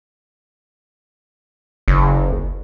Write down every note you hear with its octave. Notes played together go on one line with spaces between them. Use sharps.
F#1